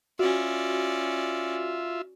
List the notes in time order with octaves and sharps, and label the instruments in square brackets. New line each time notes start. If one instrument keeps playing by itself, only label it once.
[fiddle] C#4 D5 [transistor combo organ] F4 E5 [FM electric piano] F#4